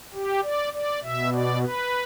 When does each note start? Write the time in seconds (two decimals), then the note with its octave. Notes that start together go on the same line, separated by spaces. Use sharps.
0.14 G4
0.43 D5
0.73 D5
1.03 B2 E5
1.32 D5
1.62 B4